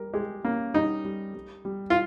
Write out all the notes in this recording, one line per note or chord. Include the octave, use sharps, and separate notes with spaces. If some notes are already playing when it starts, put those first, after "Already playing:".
Already playing: G3 A#4
G#3 G4
A#3 C#4
G3 D#4
G3
G3
G3
F4